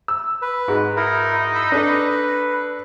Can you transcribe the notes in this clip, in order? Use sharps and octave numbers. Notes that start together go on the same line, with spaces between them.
E6
B4
G#2 G#3 F#4
D#4 E4 A#4
B5 E6
D4 A4 B4